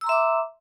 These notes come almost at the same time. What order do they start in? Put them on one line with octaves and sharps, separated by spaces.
E6 A#5 C6 E5 D6